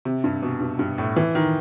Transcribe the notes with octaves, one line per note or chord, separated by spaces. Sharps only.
C3
G2
B2
G2
G2
A2
E3
D#3